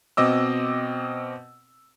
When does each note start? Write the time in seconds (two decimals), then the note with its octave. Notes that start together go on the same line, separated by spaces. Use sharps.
0.17 B2 C4 D#5 D6 E6